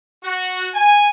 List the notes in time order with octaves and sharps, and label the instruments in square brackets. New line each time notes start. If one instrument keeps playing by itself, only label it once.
[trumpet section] F#4
G#5